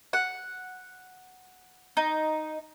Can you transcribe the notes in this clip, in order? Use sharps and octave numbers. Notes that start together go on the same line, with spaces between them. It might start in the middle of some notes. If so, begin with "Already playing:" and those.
F#5
D#4